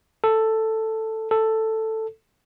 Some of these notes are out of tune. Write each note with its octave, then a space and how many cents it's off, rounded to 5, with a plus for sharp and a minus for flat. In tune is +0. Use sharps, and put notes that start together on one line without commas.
A4 +5
A4 +5